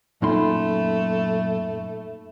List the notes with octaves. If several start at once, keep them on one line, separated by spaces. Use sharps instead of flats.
F#2 A#2 A3 D#4 B5 C6